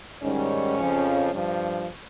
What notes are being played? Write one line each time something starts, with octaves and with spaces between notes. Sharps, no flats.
G#2 D#3 G3 C#4
F2 C#3 F3
G2 F3